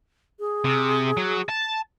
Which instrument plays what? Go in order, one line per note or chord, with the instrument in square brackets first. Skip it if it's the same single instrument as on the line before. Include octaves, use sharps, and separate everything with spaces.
[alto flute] G#4
[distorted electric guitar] C3
F#3
A5